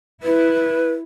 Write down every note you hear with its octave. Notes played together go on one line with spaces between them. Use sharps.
E4 B4